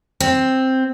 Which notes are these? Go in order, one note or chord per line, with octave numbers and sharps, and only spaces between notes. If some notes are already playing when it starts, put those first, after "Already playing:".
C4